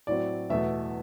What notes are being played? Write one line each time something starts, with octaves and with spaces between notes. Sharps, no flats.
A2 F#3 C4 D5
E2 B2 A3 E5